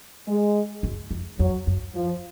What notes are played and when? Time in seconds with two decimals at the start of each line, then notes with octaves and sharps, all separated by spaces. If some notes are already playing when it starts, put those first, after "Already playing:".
0.27 G#3
0.83 F#2
1.11 F2
1.39 F2 F#3
1.67 F#2
1.95 F3